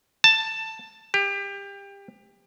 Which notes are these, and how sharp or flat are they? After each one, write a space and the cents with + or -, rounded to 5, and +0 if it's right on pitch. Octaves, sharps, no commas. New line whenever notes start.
A5 +10
G4 +25